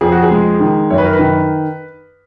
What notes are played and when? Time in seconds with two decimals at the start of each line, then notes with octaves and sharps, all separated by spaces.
0.01 F2 G#4
0.12 F#4
0.22 G#4
0.31 G#3
0.60 D#3
0.90 F#2 C#5
0.98 B4
1.05 A#4
1.13 B4
1.19 D#3